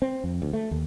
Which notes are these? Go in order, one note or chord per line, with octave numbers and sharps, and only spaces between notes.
C4
F2
D2
A3
D#2